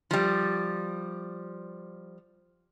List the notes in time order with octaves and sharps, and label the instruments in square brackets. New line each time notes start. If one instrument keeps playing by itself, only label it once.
[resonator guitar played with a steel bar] F3 G3